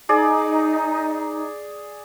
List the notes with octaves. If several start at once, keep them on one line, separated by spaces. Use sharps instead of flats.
D#4 G#4 D5